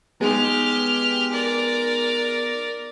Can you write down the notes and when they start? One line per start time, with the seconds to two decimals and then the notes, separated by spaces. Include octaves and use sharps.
0.21 G#3 B3 D#4 G4 F6
1.32 A#4 D5